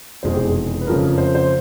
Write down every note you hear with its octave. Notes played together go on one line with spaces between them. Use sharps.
F1 E2 B2 G#3 C5
G4
G#4
B4
F2 C#3 F3 A3 A#4
C5
C5